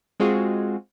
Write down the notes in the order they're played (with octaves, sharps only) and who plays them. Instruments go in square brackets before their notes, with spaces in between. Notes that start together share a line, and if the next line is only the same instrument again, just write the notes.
[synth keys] G#3 C4 F4 F#4 G#4